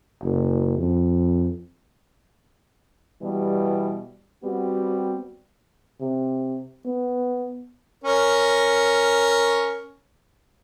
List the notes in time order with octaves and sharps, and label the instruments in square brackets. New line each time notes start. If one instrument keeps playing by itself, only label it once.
[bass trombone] F#1
F2
[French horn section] B2 E3 G3
G3 B3 C4 F#4 G4
[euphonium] C3
B3
[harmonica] C#4 A#4 C#5